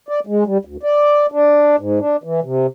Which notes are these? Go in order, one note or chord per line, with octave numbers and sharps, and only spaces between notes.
D5
G#3
G3
D2
D5
D4
G#2
D4
E3
C3